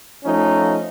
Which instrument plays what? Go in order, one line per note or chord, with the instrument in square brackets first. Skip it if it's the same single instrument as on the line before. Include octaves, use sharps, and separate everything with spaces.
[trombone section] F3 A3 C#4 D#4